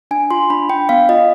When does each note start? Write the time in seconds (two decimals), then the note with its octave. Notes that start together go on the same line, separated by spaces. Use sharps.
0.11 D4 G#5
0.31 F4 C6
0.50 D4 B5
0.70 D4 G5
0.89 B3 F5
1.09 F4 D#5